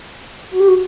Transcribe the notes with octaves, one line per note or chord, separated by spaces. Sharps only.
F#4
G4
F#4